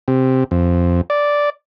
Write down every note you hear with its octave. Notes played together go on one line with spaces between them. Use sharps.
C3
F2
D5